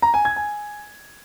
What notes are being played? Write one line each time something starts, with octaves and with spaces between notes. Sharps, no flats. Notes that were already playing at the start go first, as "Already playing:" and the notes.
A#5
G#5
G#6
G#5